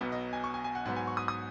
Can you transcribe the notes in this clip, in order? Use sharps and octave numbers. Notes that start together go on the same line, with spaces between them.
B1 B2 F#3 B3
D#5
G#5
C#6
G#5
G#5
F#5
G#2 F#3 B3 F#5
G#5
C#6
D#6
D#6